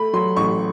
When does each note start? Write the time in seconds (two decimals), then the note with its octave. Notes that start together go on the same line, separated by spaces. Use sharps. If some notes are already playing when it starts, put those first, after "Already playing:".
Already playing: A3 B5
0.13 F#3 C6
0.36 A1 C#6